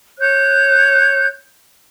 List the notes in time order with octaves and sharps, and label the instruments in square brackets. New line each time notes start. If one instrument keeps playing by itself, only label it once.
[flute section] C#5 F#6 G6